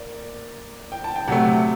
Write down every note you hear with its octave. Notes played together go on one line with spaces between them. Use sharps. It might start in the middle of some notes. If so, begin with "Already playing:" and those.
Already playing: A#3 D5
G5
A5
G5
C3 F#3 A3 F#5